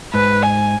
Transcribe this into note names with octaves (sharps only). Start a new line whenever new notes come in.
G#2 B4
G#5